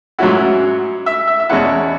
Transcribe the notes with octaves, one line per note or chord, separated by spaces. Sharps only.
G#2 F#3 C#4 E4 F#4
E5
E5
E5
E2 B2 G#3 C#4 E4 F#5